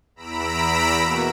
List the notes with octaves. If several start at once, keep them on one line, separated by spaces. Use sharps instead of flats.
E2 A#5 B5 E6 B6 D7
B2 A#3 F#4